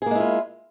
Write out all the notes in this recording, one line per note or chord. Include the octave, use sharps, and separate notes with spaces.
G#3 A#3 E4 F4 G#4